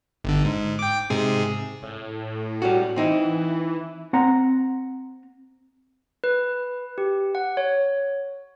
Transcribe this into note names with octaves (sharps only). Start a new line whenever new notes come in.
G1 D3
G#2
G5 D6
G#2 C3 G#4
A2
G3 C#4 F#4
E3 C4 D#4 E4
C4 F#5 A#5
B4
G4
F#5
C#5